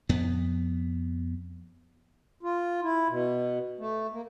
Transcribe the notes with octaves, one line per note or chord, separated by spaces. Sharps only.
F2 B3
F4
E4
B2
A3
A#3